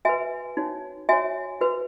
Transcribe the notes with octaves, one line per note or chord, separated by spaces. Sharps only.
F#4 B4 E5 G#5
D#4 F#4 C#5
F#4 C#5 E5 G#5
F#4 B4